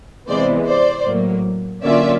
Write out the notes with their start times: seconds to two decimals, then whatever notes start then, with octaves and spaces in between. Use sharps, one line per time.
0.27 C3 E3 G#3 B3 C5 D5
0.66 C5 D5
1.06 A2 F#3 A#3
1.83 D3 F#3 A#3 C#4 F4 D5 E5